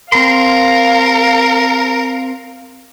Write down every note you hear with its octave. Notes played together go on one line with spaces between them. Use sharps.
C4 A#4 F5 C6